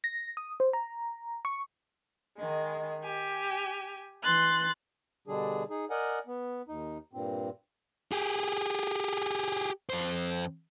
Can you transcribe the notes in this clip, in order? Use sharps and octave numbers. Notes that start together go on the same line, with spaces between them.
A#6
D#6
C5
A#5
C#6
D#3 G#3
G4 G#5
E3 C6 F#6 A6
B2 D3 G3 D4 G#4
D#4 G#4
A#4 D5 D#5 F#5 G#5
B3
D#2 D#4
G2 A#2 C4
G4 G#4
F2 C5